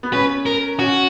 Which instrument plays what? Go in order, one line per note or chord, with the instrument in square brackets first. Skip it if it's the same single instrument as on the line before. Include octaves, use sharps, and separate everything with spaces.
[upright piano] B3
[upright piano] C#4 [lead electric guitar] B4
[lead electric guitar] A#4
[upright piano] C#4 [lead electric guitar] F#4